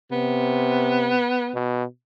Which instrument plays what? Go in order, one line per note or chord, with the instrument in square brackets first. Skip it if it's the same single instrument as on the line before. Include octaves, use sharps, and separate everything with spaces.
[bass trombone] C3 [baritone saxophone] B3
[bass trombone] B2